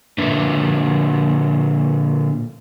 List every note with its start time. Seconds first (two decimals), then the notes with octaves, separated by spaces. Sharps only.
0.18 A#2 D3 D4 B4 E5